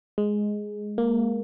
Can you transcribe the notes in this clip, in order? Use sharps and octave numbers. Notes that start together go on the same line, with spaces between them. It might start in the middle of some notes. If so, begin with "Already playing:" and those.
G#3
A#3